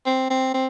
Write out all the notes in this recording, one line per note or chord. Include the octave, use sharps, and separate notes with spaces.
C4
C4
C4